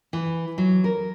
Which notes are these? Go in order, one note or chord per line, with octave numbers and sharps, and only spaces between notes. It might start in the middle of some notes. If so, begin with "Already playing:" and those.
E3
F#3
A#4